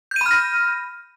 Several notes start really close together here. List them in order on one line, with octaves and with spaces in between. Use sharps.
G6 D#7 B5 F6 A#6